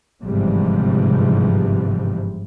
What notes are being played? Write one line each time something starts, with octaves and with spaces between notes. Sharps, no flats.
G1 G#2 C3 E3 F3 G3